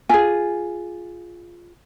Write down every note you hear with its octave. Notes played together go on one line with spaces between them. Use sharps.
F4 G#4 G#5